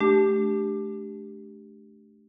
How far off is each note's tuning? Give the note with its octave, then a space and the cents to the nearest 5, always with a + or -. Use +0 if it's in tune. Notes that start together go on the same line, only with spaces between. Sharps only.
A3 -35 D4 +0 G4 +0